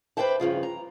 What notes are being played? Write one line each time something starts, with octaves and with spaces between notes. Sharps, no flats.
B4 C5 D5 E5 G5 A5
G2 C#3 F3 F4
A#5